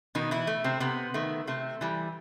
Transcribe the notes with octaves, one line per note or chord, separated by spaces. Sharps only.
B2 D#3 D#4
E3 E4
A3
C3 C4
C3 B3
D#3 A3
C3 A3
E3 G3